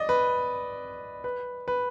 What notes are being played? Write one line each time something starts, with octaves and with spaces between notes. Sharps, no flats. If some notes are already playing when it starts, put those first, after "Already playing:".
Already playing: D5 D#5
B4
B4
B4